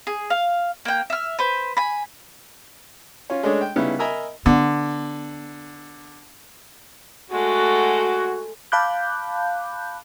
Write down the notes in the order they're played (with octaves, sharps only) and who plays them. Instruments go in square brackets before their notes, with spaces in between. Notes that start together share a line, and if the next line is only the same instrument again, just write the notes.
[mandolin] G#4
F5
A#3 G5
E5 F6
B4 C5
G#5 B5
[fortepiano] C#4 F4
G#3 A3 C#4 D4 C#5 D#5
G5
C#3 G3 B3 D#4 E4
A#4 D#5 E5 G#5 A#5 B5
[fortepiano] D3 [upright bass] B3
[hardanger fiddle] G#3 A3 [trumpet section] F#4
[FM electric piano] F5 A5 B5 D6 F#6 G6